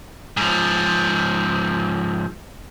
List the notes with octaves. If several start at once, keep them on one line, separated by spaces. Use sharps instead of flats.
G#2 F3